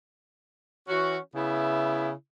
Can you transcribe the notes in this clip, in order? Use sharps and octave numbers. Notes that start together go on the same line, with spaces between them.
E3 C#4 F#4
C#3 B3 E4